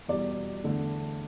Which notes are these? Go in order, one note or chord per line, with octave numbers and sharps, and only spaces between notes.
E2 B2 G3 D5
E2 D3 A3